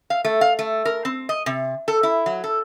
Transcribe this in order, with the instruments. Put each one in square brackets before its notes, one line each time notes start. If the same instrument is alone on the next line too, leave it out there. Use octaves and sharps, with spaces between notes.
[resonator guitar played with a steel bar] F5
A3
F5
A3
A#4
C4
D#5
C3
A4
E4
F#3
A4